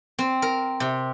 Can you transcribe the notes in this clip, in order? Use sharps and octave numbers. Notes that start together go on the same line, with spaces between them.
C4
A#4
C3